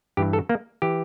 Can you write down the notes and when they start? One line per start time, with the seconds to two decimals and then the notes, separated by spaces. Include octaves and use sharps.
0.17 G2 E3 G4
0.33 A4
0.49 A#3
0.82 E3 G4